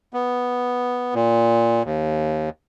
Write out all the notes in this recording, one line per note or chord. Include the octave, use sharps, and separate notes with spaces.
B3
A#2
D#2